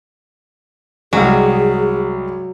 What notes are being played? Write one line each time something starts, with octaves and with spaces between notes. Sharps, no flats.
C2 F#3 G#3 G#4